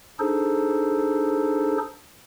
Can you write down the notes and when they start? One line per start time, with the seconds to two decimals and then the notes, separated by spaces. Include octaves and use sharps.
0.19 D4 D#4 G#4 A4 C5